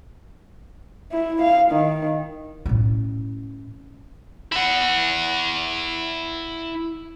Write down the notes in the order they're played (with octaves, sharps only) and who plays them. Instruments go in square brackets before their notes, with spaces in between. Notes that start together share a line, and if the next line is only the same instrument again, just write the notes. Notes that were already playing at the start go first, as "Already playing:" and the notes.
[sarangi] E4
F5
D#3
[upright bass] A2 C#4
[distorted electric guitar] E4 F#5